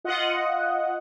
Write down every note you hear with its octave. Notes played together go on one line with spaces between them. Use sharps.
F4 D#5 F#5